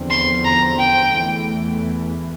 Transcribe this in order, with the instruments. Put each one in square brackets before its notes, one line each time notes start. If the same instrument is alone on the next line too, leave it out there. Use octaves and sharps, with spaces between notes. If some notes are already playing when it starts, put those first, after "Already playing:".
Already playing: [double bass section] E2 D3 F3 C4
[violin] C6
A#5
G5
[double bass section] E2 E3 A3